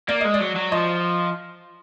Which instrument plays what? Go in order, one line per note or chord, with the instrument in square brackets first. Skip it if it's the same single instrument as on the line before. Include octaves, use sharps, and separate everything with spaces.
[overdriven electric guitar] A#3 [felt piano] D5
[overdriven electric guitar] G#3 [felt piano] D#5
[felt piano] D5
[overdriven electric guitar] F#3
F#3
[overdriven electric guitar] F3 [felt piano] D#5